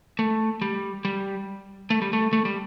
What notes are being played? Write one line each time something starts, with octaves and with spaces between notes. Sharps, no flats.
A3
G3
G3
A3
G3
A3
A3
G3